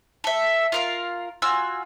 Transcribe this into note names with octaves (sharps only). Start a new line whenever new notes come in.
A4 E5
F4 A#4 F5
F4 F#4 G#5 E6